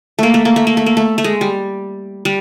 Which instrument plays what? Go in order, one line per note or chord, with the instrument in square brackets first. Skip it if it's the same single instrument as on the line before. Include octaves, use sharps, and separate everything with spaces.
[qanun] A3 A#3
A3
A#3
A3
A#3
A3
A#3
A3
A3
G#3
G3
G3